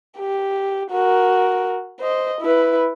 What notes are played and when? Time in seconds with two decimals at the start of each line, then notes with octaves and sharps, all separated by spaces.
0.18 G4
0.91 F#4 A#4
2.00 C5 D#5
2.41 E4 B4